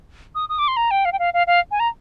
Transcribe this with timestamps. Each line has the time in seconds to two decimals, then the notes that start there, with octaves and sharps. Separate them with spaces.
0.35 D#6
0.49 D#6
0.59 D6
0.68 C6
0.76 A#5
0.91 G5
1.05 F5
1.12 G5
1.19 F5
1.34 F5
1.47 F5
1.71 G#5
1.80 A#5